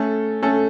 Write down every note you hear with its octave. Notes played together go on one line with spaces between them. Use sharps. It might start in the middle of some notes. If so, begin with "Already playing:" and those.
Already playing: A3 C#4 A4
A3 C#4 A4